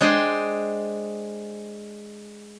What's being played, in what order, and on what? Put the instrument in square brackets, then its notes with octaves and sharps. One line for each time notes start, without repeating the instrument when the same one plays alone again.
[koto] G#3 D4 C5 D#5 G5 G#5